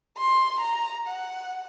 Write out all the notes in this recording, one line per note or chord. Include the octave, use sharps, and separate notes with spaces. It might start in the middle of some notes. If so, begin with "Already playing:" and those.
C6
A#5
F#5